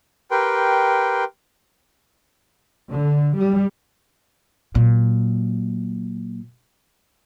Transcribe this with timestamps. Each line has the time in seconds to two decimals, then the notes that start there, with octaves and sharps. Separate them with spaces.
0.31 G4 A#4 B4 G5 C6
2.90 D3
3.37 G3
4.75 A#2 F#3